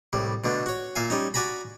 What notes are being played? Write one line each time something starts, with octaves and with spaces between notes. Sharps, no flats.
C2 A2 G3
B2 D3 A3
F#4 C#5
A#2 E5 F5 G#5
G3 C#4 D#4
F#4 D5 G#5 A#5 B5